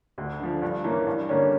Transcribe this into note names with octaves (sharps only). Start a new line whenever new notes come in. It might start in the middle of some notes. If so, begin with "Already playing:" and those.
D2
D3 F3
G2
E3 A#3 C#4
G2
D3 G3 A#3 C#4